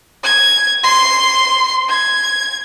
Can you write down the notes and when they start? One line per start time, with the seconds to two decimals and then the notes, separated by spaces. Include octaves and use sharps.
0.22 G#6
0.83 C6
1.88 G#6